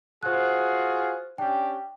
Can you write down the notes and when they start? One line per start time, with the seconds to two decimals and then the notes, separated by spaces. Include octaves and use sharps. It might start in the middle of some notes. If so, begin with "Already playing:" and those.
0.23 F4 F#4 G#4 C5 F#6
1.38 C#4 D4 G4 G5